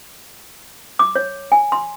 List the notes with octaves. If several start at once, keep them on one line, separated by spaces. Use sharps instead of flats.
D6
C#5
G#5
C6